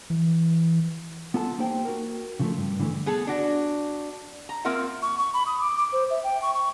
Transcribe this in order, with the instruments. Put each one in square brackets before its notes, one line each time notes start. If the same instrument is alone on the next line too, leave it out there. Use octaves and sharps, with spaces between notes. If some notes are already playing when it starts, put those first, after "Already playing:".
[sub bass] E3
[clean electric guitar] B3 F4 A4 F#5 A5
A#3 D#4 G4 C5 G5
F#4 A#4
C#3 F3 A3
G2
D3 E3 G3 A3
[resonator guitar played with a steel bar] B3 G#4 A4
D4 F#4
A#5
A#3 C4 F4 A#4 E5 F#5
[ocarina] C#6
C#6
B5
D#6
D6
D6
C5
E5
G5
C#6
C#6